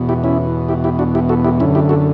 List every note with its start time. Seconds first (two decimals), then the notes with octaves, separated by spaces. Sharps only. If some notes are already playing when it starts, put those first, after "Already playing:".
Already playing: E2 B2
0.09 E4 G4
0.24 C#4 E4
0.69 E4 G4
0.84 E4 G4
0.99 D4 F#4
1.15 E4 G4
1.29 F#4 A4
1.44 E4 G4
1.60 F#2 D3 C#4 E4
1.75 E4 G4
1.89 F#4 A4